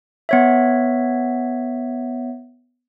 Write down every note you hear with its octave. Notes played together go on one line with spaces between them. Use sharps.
B3 C#5 E5